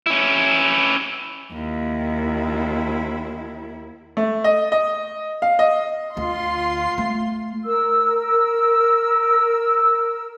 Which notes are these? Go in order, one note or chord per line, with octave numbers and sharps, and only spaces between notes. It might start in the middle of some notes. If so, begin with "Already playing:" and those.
C#4 E4
D#2 E4
A3
D#5
D#5
F5
D#5
D2 F4 C6
A3
A#4 E6